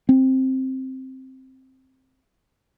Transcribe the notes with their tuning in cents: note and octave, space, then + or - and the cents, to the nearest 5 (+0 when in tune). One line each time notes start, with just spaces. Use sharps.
C4 +5